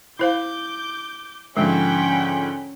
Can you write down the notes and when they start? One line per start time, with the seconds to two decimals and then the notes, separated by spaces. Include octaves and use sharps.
0.19 E4 C5 F5 D6 G6
1.57 G#2 D3 F3 G#3 C#4 G5 B5